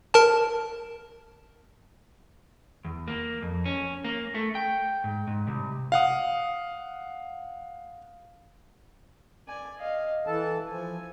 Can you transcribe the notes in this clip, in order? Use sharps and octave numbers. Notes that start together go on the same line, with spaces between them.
A#4 A5
E2
A#3
F2
C#4
A#3
A3
G5
G#2
G#2
C2
F5 F#5 D#6
D5 G#5
D#5 F5
E3 E4 A4 A5
F3 G#5